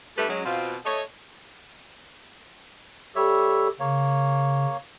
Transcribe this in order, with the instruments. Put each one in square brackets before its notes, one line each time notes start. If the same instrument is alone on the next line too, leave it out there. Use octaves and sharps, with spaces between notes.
[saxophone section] G2 G3 A3 G4 A4 B4
F#3 G#3 C#4
B2 C4 F4
A3 C#5 D#5
[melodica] G3 C#5 E5 [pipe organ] G4 A4
[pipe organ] C#3 [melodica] A#3 C#5